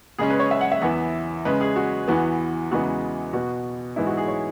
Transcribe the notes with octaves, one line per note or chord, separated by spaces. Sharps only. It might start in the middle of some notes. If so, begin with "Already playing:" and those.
C#3 G#3 C#4 G#4
B4
C#5
E5
F#5
E5
E2 E3 B3
C#3 G#3 C#4 B4
G#4
F#4
E2 E3 B3 F#4
E2 C#3 E3 G#3 B3 F#4
B2 B3 F#4
G#2 E3 G#3 B3 E4
F#4
G#4
C#5